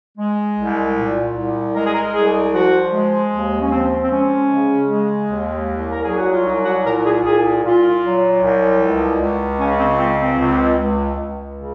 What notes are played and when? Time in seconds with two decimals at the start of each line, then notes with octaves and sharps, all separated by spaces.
0.18 G#3
0.57 C2
0.96 A#2
1.35 C2
1.75 G#3 A#4
1.84 G#4
1.94 A#4
2.13 C2 G#4
2.53 F3 F#4
2.92 G#3
3.32 D#2
3.62 C#4
3.71 F3 C4
4.04 C4
4.10 G#3 C#4
4.49 C#3
4.88 G#3
5.28 D#2
5.67 C2
5.90 A#4
6.04 F#3 G#4
6.17 F#4
6.31 F4
6.45 C2 D#4
6.65 F#4
6.85 A#2 A#4
7.04 G#4
7.24 C2 G#4
7.63 A#2 F4
8.02 F#3
8.41 C2
8.81 C#2
9.20 C#2
9.59 C#3 C#4
9.79 C4
9.98 C#2 C4
10.18 C4
10.38 C#2
10.77 C#2
11.16 C#2
11.55 C#3